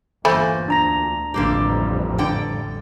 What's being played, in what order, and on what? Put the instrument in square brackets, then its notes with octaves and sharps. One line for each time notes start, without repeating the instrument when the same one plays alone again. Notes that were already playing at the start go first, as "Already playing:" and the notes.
[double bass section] G1 [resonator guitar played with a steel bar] E2 A#2 [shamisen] A3 G#5 B5 [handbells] C5 A6
[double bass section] D2 [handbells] D4 A#5 A#6
[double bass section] A1 F2 G3 [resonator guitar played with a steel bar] D3 A#3 G4
[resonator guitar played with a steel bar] D3 G5